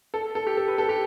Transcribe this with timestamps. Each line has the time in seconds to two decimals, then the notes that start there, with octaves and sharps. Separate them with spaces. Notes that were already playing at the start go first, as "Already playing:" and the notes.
0.14 A4
0.35 A4
0.47 G4
0.57 A4
0.68 B4
0.78 A4
0.89 G4